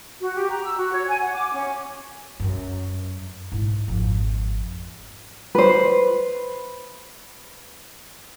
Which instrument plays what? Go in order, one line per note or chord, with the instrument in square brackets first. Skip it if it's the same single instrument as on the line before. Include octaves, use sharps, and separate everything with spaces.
[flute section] F#4
G4
A#5
E6
F#4
C#5
G#5
F#5
D6
C#4
[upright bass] F#2
G#2 E4
G#1 F2
[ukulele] B4 C5